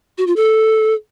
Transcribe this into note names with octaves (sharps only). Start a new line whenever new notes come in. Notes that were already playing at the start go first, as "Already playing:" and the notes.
F#4
F4
A4